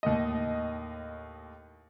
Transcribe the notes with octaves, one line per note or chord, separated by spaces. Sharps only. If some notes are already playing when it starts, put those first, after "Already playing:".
D#2 A2 D#5